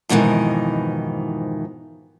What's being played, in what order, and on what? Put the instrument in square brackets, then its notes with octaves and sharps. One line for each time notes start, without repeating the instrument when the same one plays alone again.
[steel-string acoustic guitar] F2 G#2 B2 D#3 E3